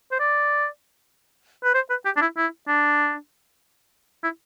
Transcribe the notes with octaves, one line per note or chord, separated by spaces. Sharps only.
C5
D5
B4
C5
B4
G4
D4
E4
E4
D4
E4